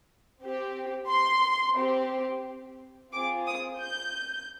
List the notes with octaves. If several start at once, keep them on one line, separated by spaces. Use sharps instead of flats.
C4 G4
C6
C4 G4
C4 F4 G#4 D6
D#6
G6